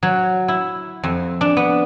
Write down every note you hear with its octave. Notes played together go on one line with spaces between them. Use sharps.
F#3
E4
F2
D4
B3